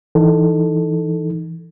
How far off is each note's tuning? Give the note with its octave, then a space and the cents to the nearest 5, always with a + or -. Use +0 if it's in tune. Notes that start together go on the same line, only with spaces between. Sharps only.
E3 +0 D#4 +0 A4 +0